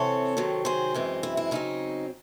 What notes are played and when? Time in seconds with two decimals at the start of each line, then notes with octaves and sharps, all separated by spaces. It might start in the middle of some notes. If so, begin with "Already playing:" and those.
Already playing: C3 E3 C4 A4 C#5
0.37 C3 D#3 F#3 C4
0.65 G#4 C5
0.94 F#2 E3 G#3 C4
1.23 E4
1.37 E4
1.51 C#3 F#3 C4 D#4